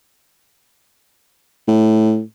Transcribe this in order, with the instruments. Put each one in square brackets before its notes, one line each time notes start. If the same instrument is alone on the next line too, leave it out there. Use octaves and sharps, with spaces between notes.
[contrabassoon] A2